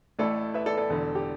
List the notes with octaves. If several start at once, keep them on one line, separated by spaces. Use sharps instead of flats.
A1 A2 A3 E4 A4 D5
B4 E5
A4 D5
A4 D5
E1 E2 D3
G4